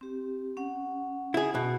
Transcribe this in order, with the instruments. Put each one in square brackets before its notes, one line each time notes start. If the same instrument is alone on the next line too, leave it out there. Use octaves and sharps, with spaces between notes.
[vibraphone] C4 G4
C#4 F#5
[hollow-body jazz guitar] E4 G#4
B2